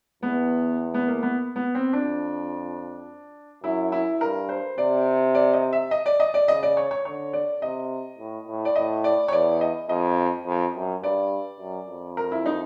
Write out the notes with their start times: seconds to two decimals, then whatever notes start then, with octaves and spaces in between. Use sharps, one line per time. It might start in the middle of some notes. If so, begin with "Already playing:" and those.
0.23 E2 B3
0.94 B3
1.08 A#3
1.23 B3
1.56 B3
1.75 C4
1.93 F2 D4
3.63 F#2 E4
3.92 E4
4.20 G2 A#4
4.49 C5
4.78 C3 D5
5.35 D5
5.53 D#5
5.73 E5
5.91 D#5
6.06 D5
6.20 D#5
6.34 D5
6.48 C#3 D#5
6.63 D5
6.77 C#5
6.91 C#5
7.05 D3 C#5
7.33 D5
7.62 C3 D#5
8.18 A2
8.48 A2
8.65 D5
8.76 A2 D#5
9.04 D5
9.28 C#5
9.32 E2 D5
9.61 D#5
9.89 F2 D#5
10.46 F2
10.75 F#2
11.03 G2 D5
11.60 F#2
11.88 F2
12.17 A#4
12.31 E4
12.46 D#4